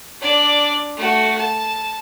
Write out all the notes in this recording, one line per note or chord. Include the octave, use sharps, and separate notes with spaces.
D4 D5
A3 F#4
A5